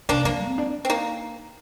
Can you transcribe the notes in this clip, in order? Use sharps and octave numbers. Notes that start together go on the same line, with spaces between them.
C3 A#3 D4
F3 A#3
C4
D4
C4
A#3 D#4